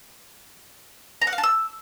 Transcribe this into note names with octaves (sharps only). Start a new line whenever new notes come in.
A#5
F#5
F5
A5
E6